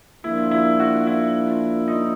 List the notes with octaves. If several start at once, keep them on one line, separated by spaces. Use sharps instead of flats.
F3 A#3 D4 E4 F4
E4
F#4
E4
D#4